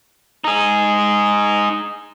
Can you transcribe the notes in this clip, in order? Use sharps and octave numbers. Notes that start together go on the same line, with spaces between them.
D#4 G#4